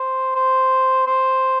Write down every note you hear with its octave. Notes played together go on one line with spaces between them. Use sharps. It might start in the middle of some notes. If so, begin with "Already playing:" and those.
Already playing: C5
C5
C5